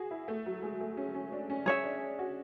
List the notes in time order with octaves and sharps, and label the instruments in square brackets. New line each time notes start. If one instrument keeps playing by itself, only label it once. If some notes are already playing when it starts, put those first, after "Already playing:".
Already playing: [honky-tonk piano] F#4 G#4
E4
A3
F#3
G#3
A3
C#4
C#4
D4
C#4
[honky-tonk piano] C#4 [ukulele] G#4 C#5 E5
[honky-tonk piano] D4
F#4